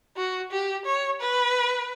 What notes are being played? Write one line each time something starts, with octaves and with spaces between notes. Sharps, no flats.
F#4
G4
C#5
B4